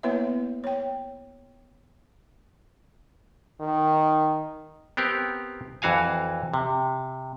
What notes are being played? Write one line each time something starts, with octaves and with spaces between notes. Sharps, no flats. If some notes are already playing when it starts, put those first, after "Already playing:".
A#3 B3 E4 B4 C#5 E5
C#5 G5
D#3
B3 C4 G4 A#4
F2 E3 F#4 F5 G#5
C3